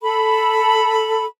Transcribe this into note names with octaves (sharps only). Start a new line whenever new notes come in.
A4 B5